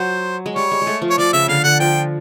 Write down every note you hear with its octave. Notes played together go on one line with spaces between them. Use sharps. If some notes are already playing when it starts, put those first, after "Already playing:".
Already playing: F#3 C5
G#3
G3 C#5
G#3
G#3
A3
F3
C#5
F3 D5
C#3 E5
D3 F5
D3 F#5
F3 G5